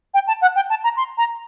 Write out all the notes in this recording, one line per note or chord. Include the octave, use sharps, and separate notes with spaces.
G5
A5
F#5
G5
A5
A#5
C6
A#5